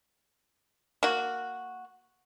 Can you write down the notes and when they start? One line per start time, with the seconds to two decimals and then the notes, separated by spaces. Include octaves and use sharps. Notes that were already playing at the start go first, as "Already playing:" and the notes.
1.03 A#3 F#4